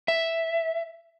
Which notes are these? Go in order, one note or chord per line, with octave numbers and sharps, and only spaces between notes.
E5